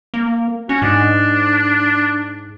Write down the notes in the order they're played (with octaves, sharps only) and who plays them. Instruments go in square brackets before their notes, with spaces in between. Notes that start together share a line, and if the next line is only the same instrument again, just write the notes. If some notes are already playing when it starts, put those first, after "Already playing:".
[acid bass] A#3
[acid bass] C#4 [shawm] F#4
[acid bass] G#2 [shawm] D4